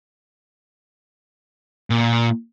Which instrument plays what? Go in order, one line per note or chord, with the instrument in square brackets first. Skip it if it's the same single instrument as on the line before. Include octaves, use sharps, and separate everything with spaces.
[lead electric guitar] A#2